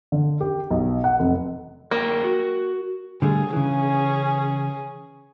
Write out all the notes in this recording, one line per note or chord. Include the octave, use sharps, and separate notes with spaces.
D3
G4
B1
F#5
F1
F#2 A#3 A#4 G5
F#4
D3 G3 A3 G#4
C#3 E3 C#4 G#4